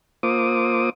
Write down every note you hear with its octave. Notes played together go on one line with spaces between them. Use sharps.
A#3 F4 C5 D6 D#6